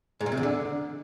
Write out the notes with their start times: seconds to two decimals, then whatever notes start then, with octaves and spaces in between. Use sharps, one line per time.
0.21 G#2
0.26 A#2
0.32 C3
0.37 E2
0.43 D3